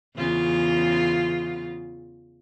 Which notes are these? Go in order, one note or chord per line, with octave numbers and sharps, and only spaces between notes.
E2 C#3 F4